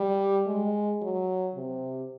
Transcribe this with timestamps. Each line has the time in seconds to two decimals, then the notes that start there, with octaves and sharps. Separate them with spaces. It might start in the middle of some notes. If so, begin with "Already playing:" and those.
Already playing: G3
0.47 G#3
1.02 F#3
1.55 C3